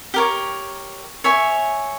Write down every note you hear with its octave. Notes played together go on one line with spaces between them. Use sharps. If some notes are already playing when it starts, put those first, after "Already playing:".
G4 A#4 C#5
C#5 E5 G#5